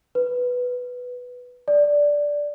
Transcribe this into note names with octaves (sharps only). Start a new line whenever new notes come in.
B4
D5